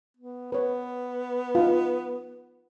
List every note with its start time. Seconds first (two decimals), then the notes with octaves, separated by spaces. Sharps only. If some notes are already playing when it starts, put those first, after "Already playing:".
0.17 B3
0.52 B3 B4 C#5
1.55 D#4 F4